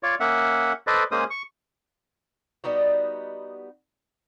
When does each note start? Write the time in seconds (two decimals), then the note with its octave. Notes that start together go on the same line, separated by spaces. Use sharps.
0.03 F4 C#5 D5
0.20 A#3 C#4 E5 F#5
0.87 A4 B4 C5 D5 D#5
1.12 G#3 A#3 C#4 C5 D#6
1.30 C#6
2.64 G3 B3 D#4 F#4